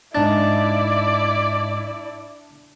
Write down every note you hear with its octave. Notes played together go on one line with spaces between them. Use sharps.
G#2 D4 E4 D5 D#5 A6